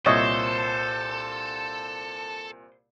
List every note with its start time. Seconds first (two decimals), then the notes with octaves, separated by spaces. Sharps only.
0.06 C2 A#2 A4 C5 C#5 D#5 E5